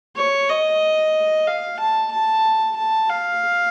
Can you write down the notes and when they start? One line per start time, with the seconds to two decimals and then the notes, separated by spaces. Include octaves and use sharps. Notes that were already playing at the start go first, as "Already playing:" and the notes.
0.17 C#5
0.50 D#5
1.47 F5
1.80 A5
2.12 A5
2.76 A5
3.10 F5